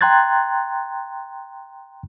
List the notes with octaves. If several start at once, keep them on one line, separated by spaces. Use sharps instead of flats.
G5 A#5 C6 F#6 G#6 A6